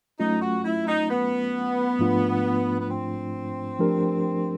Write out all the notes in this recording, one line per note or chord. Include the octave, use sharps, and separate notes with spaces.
F#3 A3 C#4 D#4 F4
F#4
E4
D#4
B3
G#2 F3 A3 D4 F4
B3
C4
F3 A3 D4 G4 A#4